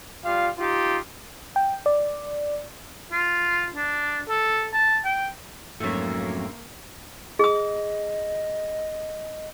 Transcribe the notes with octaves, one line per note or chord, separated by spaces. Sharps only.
G3 F4 F5
D#4 F4 G4
G5
D5
F4
D4
A4
A5
G5
F2 G#2 D3 F#3 A3 A#3 C#4
G#4 D#5 D#6